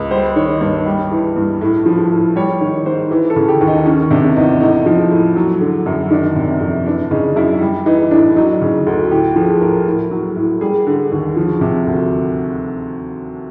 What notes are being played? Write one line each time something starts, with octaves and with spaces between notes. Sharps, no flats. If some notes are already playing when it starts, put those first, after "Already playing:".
Already playing: C#2
G3 C5
D#3 C#5
G2 C#5
G3
E3
G2
A2
F3
A2
G3 C#5
D#3 C#5
G#2 C5
E3
A4
C#3
G4
D#2
D#4
D#3 C#4
C3 D4
E2 D#4
A2 D#4
F3
A2
F#3
D3
F#2
D#3 D4
C3
F2
E3 D4
C#3 D#4
F#2 E4
G3
E3 D#4
A2 D4
F#3 D#4
C#3
D2
A2 G4
F3 G#4
A2 A#4
A2
F#3
A2
G3 G#4
D3
D#2
F3
C3
D2